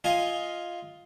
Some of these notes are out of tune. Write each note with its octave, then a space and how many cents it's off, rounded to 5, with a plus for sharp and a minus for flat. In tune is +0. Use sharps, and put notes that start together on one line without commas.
F4 +0 D#5 +10 G#5 +0